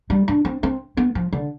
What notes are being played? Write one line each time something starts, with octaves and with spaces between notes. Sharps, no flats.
G3
D4
C4
C4
B3
F3
D3